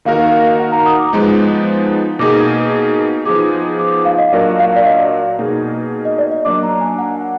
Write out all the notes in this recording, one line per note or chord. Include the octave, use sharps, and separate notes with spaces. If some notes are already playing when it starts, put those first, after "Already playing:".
D#3 A#3 D#4 F#4 A#4 F5
F#5
A#5
D#6
D6
F3 G#3 B3 D#4
B2 A#3 D#4 G#4 D6
F3 B3 D#4 G#4 D6
D6
D6
F5
D#5
A#2 F#3 D4 F#4 A#4 D5
F5
D5
D#5
B2 A#3 D#4 G#4
D#5
D5
D#5
F#3 A#3 D4 D6
A#5
G#5
F#5